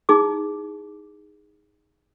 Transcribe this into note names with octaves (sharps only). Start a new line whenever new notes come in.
D#4 E4 G#4 D6